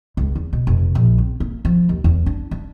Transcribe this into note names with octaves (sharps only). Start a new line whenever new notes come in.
C#2
E2
B2
F1
A#1
C4
A#3
F3
D#2
E2
D4
D4